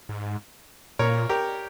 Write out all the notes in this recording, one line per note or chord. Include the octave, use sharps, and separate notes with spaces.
G#2
A#2 A#4 C#5
G4 A#4